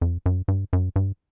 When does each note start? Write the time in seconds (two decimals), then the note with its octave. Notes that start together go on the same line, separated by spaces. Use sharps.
0.01 F2
0.26 F#2
0.48 G2
0.73 F#2
0.96 G2